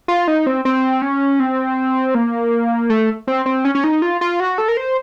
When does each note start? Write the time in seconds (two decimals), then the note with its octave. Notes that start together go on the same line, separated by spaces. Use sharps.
0.08 F4
0.28 D#4
0.46 C4
0.65 C4
1.02 C#4
1.40 C4
2.15 A#3
2.90 A3
3.27 C4
3.46 C4
3.65 C#4
3.75 C#4
3.84 D#4
4.02 F4
4.21 F4
4.40 F#4
4.58 A4
4.68 A#4
4.77 C5